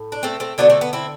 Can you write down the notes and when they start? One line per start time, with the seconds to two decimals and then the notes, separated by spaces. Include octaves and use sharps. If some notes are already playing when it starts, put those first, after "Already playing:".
Already playing: A2
0.12 D4
0.23 A3 C4
0.40 A3 C4
0.58 D3 F#3 A3 B3 D4
0.70 A3 C4
0.81 B3
0.93 C4 E4